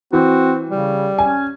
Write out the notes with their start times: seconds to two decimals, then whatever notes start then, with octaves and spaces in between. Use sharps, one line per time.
0.13 E3 C4 F#4
0.70 C#3 G3
1.18 C#4 G#5